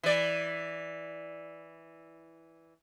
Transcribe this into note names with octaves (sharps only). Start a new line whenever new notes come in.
E3 D5